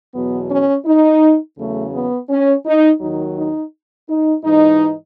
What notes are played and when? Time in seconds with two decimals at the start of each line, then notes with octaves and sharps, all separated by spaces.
0.14 E2 B2 F#3 B3
0.49 C#4
0.85 D#4
1.57 E2 C#3 F#3 A3
1.93 B3
2.29 C#4
2.66 D#4
3.00 D#2 D#3 F#3 D#4
3.37 D#4
4.09 D#4
4.44 G#2 E3 D#4